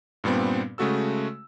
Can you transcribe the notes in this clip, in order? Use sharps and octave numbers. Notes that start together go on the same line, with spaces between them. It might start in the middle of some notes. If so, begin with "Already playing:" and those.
G2 A#2 G3 B3 C4
C#3 G#3 A3 F#4 A4 E6